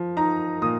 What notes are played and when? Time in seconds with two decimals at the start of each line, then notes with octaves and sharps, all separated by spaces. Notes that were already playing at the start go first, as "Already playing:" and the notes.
Already playing: F3
0.17 D#4 A#5
0.62 A#2 D#6